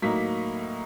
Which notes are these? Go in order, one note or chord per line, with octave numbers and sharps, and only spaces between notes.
A2 F#3 A#3 D#4 B6